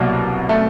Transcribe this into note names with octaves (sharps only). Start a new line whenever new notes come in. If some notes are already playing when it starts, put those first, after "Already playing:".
Already playing: C2 B2 F#3 A#3
A3